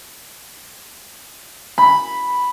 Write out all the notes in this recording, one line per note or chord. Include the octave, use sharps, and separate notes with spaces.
B5